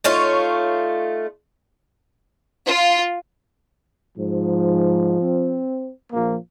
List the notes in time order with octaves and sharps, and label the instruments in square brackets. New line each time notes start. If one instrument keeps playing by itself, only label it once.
[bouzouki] A3 D#4 F4 C#5
[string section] F4
[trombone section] G#2 [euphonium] F3
[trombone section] C4
A#1 F3 A#3